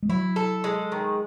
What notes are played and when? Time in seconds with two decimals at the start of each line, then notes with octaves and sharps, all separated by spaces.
0.03 G#3
0.09 F#3 E4
0.36 A4
0.64 G#3
0.92 D#3